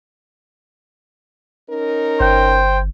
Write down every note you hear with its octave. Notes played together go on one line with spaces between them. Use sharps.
C#4 D#4 A#4
G1 C5 G5